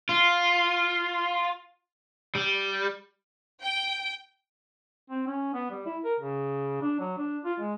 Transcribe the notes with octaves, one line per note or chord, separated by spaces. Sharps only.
F4
G3
G5
C4
C#4
B3
G3
E4
A#4
C#3
D4
F#3
D4
F4
G#3